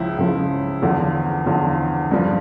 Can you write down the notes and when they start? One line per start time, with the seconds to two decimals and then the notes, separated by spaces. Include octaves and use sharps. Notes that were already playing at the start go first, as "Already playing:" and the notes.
Already playing: C#2 C#3 F3 E4
0.18 C#2 C#3 F3
0.82 E2 D3 F3
1.46 E2 D3 F3
2.11 G2 F3